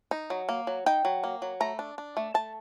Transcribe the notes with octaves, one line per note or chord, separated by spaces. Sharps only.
D#4
F#3
A#3
F#3
D#4 G5
F#3
A#3
F#3
A3 A#5
D4
D4
A3
A3 A5